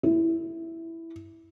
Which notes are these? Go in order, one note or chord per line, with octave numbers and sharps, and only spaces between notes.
E4